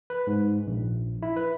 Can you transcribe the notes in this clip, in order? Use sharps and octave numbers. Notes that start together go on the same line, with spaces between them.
B4
G#2
A#1
E4
B4